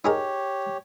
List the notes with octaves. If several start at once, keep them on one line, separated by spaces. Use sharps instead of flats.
D#4 G4 G#4 A#4 C#5